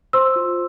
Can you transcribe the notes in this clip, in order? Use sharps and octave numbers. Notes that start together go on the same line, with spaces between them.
C5 C6 E6
F4